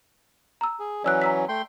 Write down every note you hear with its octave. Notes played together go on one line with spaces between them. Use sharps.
A#5 E6
G#4
E3 F#3 C#4 D5 E6 F#6
A#5 E6 B6
A3 G5 C6